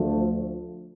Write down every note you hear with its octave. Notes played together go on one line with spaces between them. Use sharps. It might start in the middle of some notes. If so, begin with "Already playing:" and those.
Already playing: D2 D3 F3 A3